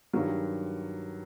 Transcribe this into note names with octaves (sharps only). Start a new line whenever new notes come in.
G2 D#3 F#3